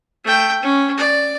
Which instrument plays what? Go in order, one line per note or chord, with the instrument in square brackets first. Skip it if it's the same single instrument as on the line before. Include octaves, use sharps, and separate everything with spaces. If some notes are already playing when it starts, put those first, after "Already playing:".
[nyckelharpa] A3 G5
C#4
D5